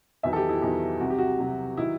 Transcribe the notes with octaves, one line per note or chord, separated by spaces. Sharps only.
E2 D#3 F#3 E5
A4
G4
E4
E2 D#3 F#3
C2 C3 F#3 F#4
G4
F#4
C2 C3 F#3
D#3 F#3 E4